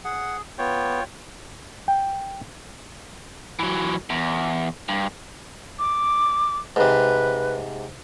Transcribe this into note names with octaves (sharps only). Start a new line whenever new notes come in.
G#4 F#5
B3 F4 C#5 G5
G5
E3 F#3
E2
G2
D6
G#2 C3 B4